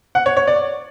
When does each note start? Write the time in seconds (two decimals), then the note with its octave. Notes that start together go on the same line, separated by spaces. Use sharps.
0.15 F#5
0.26 C#5
0.37 C#5
0.47 D5